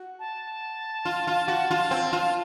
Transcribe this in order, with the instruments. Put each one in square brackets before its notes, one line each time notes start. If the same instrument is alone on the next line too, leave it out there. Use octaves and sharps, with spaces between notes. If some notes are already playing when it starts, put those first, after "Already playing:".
Already playing: [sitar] F#4
[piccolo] A5
[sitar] F4
F4
F#4
F4
C4
F4